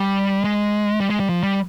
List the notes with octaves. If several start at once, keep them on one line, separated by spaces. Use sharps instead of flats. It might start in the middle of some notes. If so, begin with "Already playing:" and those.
Already playing: G3
G#3
G3
G#3
G3
F3
G3